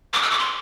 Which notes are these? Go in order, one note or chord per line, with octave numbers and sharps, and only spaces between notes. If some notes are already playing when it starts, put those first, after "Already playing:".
D6
E6
D6
C6